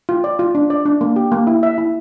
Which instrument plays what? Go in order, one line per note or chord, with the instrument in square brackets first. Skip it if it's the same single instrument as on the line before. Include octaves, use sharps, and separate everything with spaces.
[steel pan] F4
D5
F4
D4
D5
D4
A#3
G4
A#3
E4
E5
E4